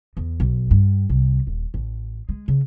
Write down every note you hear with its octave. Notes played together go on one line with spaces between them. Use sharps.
E2
B1
G2
C2
D#1
A1
G#3
C#3